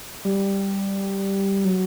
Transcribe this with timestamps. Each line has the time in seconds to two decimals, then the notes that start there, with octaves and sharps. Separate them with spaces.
0.25 G3
1.65 F#3